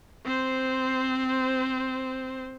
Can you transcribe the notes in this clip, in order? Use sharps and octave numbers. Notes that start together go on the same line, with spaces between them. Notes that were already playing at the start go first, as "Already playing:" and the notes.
C4 C5